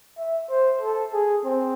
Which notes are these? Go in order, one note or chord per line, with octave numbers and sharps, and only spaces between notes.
E5
C5
A4
G#4
C4